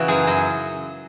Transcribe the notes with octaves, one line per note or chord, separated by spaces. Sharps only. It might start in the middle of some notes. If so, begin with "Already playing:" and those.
Already playing: C#3 E3 F#4
F#2 G#4
F#2